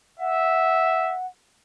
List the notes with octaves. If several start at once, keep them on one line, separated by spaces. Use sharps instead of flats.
E5 F#5